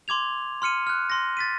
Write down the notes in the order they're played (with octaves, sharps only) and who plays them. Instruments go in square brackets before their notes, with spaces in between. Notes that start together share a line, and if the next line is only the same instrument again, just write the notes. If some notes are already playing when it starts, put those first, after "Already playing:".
[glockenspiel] C6 D6 G#6 F7
C6 F6 C#7 D#7
F6 F#6
C6 A#6
A6 B6 D#7